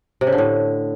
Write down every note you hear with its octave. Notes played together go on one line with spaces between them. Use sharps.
C3
C#3
D3
A2